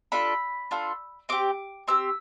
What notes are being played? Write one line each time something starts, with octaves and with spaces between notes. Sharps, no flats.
D4 F4 A4 B5
D4 F4 A4
C4 G4 D6
C4 G4 E6